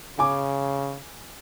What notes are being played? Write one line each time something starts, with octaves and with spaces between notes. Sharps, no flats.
C#3 G#5 D6